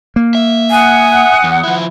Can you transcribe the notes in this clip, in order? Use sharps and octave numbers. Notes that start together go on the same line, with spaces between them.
A#3
E5
F#5 G#5 D#6 F#6
E2
F3 E4